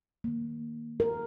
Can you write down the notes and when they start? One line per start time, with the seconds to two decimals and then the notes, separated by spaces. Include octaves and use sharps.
0.24 D#3 A#3
1.00 A#4